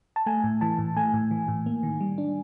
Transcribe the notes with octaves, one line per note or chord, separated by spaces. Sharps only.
A5
A3 G#5
A2
E3 A5
A2
A3 G#5
A2
E3
A2
A#3
D#3
G3
D4